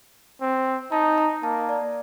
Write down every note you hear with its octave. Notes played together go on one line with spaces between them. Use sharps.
C4
D#4 A5
A#5
A#3 A5
D5